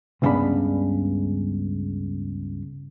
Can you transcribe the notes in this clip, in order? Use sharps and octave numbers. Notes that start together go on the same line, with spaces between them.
C#2 G2 C#3 B3 D4 B5